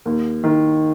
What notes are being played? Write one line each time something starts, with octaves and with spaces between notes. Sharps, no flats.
D#2
D#3